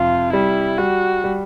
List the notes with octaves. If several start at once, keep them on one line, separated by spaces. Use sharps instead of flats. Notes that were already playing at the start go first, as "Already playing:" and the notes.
Already playing: F2 C3 F4
G3 E4
G3 F#4
G3